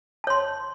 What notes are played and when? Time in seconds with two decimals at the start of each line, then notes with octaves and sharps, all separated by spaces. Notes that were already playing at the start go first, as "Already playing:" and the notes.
0.24 A5
0.27 C#5
0.30 C6